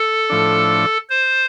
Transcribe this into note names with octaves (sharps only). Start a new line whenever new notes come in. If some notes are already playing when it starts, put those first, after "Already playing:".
Already playing: A4
A2 F3 D4
C5